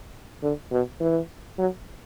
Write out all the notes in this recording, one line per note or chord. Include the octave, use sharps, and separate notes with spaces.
D3
B2
E3
F#3